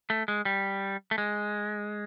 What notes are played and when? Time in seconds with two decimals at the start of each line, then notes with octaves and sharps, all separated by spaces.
0.10 A3
0.28 G#3
0.45 G3
1.11 A3
1.18 G#3